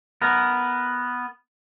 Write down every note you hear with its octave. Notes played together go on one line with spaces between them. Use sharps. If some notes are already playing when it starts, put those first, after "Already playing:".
B3 A#4